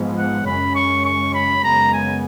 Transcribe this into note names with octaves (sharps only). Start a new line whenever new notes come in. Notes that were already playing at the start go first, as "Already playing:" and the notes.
Already playing: G#2 F3 G#3 B3
F#5
F#2 C#3 G#3 C#4 B5
C#6
C#6
B5
F#2 C#3 G#3 B3 A#5
G#5